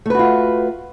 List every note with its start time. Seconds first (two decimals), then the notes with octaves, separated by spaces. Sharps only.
0.06 A3
0.10 B4
0.15 F#4
0.19 F4